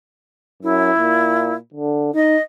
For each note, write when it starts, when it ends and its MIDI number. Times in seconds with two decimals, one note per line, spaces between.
0.63 0.91 42
0.63 1.54 64
0.99 1.57 46
1.74 2.09 50
2.14 2.36 63
2.14 2.41 75